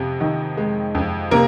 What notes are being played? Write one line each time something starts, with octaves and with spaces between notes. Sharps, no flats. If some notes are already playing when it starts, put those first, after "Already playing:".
Already playing: F2 C3
D#3
G#3
F2
C3 A#3 A#4